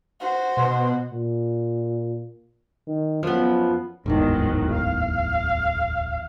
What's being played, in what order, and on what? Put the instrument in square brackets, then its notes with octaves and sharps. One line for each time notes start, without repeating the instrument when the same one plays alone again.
[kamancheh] F#4 C5
[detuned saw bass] B2 [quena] C6
[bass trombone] A#2
D#3
[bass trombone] F#2 [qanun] F3 B3
[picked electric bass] D1 G1 E2 [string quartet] G#2 D#3 F#3
[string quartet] F5